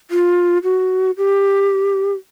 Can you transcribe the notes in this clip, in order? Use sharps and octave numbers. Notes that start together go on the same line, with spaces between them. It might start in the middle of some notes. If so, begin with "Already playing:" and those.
F4
F#4
G4